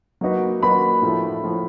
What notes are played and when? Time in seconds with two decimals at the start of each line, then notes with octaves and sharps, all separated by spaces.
0.21 F#3 A#3 D#4 F#4 B4
0.61 F#3 A#3 D#4 F#4 B4 B5
1.02 A2 F3 A3
1.44 A2 F3 A3